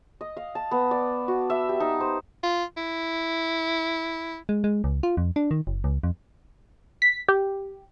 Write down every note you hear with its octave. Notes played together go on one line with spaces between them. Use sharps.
D#5
F5
A5
B3
D5
F#4
E5
G4
D#4
C5
F4
E4
G#3
G#3
C#2
F4
F2
D4
D#3
F#1
C#2
F2
B6
G4